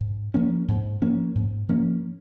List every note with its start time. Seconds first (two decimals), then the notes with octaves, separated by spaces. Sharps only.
0.01 G#2
0.34 F3 A#3 C#4
0.68 G#2
1.02 F3 A#3 C#4
1.35 G#2
1.69 F3 A#3 C#4